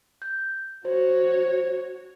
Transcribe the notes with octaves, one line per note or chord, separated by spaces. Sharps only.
G6
F#4 C5 C#5